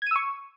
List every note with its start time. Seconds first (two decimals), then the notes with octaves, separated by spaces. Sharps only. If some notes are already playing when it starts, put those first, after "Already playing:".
0.02 G#6
0.06 D#7
0.11 E6
0.16 C#6